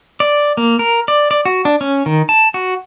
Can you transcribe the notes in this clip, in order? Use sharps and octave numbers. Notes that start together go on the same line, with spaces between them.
D5
A#3
A#4
D5
D5
F#4
D4
C#4
D#3
A5
F#4